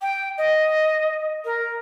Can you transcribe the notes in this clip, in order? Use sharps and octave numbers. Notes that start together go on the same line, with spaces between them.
G5
D#5
A#4